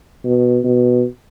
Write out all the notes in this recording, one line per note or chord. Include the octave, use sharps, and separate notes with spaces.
B2
B2